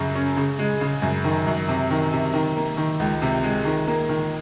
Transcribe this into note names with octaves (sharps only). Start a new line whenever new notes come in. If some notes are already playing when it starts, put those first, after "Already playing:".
Already playing: F#2 C#3
C#4
C#3
G#3
C#3
F#2
D#3
F#2
C3
D#3
C3
D#3
A#3
D#3
C#2
C3
G#3
D#3
A#3
D#3